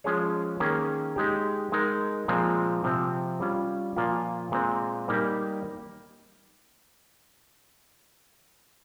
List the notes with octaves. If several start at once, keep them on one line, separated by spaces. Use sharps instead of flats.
F3 G#3 C#4 G#4 C#5
D#3 A#3 C#4 G#4
G#3 D#4 G4
G#3 D#4 A#4
A#2 F3 G#3 C4
C3 F3 C4
G3 C#4 F4
A#2 F3 A#3 F4
A#2 G#3 C4
G3 A#3 D#4 G4 A#4